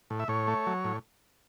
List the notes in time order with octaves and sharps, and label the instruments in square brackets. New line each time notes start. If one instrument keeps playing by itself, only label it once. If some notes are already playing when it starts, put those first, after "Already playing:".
[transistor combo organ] A2
E5
A2 C#5
A3
F#3
A2